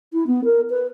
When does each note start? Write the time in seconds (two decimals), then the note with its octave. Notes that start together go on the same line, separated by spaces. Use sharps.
0.13 E4
0.27 B3
0.44 A#4
0.70 B4